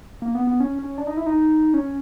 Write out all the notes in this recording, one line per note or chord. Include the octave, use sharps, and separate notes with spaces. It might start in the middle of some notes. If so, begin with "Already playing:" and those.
A#3
B3
B3
C#4
C#4
D4
D#4
E4
D#4
C#4